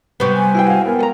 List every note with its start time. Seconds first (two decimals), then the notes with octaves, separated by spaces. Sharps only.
0.20 C3 G3 B3 B4 C#6
0.34 G#5
0.54 E4 G#4 G5
0.66 F#4 F5
0.85 B3 A#4
0.99 A4 A#5